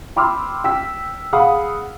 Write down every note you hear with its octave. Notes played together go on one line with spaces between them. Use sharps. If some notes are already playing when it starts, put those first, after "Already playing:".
G5 B5 C6 D6 E6 F6
G5 E6 B6
G#4 F5 F#5 B5 D#6